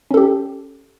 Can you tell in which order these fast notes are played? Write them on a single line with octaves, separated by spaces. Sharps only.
C#4 A4 G4